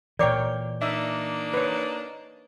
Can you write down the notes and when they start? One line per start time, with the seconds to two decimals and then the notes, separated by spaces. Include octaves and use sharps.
0.19 A#2 E3 A#4 C#5 D5 G5 D6
0.82 A#3 D4 D#4 E5
1.54 B4 C#5